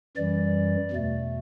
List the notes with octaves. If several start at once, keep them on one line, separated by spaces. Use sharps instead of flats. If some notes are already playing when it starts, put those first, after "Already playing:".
F#2 E3 G3 D5
E2 B2 A3